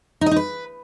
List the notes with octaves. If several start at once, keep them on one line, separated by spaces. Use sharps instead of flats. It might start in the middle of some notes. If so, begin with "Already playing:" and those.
D#4
D#5
D#4
B4